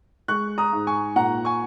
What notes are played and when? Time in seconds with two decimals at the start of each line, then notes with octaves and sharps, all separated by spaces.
0.28 G#3 C#6 F#6
0.58 A#5 D#6
0.73 G#2
0.87 G#5 C#6
1.16 A#2 F#5 A#5
1.45 G#5 C#6